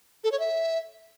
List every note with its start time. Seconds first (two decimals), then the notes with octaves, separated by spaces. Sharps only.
0.24 A4
0.32 C#5
0.40 E5